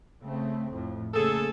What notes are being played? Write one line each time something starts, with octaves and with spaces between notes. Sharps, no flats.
C#3 A3 C4
F2 A2
C#3 A3 A#3 G#4 A4